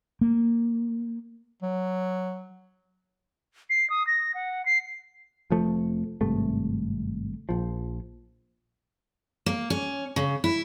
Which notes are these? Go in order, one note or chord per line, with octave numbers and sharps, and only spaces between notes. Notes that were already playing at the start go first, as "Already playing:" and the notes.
A#3
F#3
C7
D#6
A#6
F#5
C7
F1 F2 F3 A3
G#1 G2 C3 A3
A#1 F3
A#3
C#4
C#3
E4